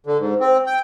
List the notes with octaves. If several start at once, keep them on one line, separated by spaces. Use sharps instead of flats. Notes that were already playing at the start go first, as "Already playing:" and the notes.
D3
G#2
C4
G5